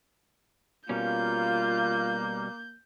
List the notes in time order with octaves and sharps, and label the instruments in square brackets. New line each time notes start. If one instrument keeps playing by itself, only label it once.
[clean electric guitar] B2 G3 C#4 [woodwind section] A#3 [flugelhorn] F4 [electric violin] G6